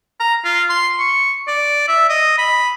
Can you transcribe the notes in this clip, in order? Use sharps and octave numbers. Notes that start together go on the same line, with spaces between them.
A#5
F4
C6
C#6
D5
E5
D#5
B5